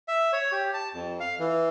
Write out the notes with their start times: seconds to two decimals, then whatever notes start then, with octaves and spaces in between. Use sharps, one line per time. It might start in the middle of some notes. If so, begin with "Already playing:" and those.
0.08 E5
0.33 C#5
0.52 G4
0.74 A5
0.94 F2
1.20 F5
1.40 E3